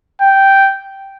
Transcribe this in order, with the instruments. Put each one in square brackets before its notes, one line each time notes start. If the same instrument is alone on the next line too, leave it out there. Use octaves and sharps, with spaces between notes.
[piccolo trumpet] G5